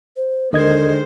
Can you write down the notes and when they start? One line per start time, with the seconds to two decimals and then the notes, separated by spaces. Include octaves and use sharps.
0.17 C5
0.53 D#2 D3 D#3 G#3 A#4 C5 D#5 G#6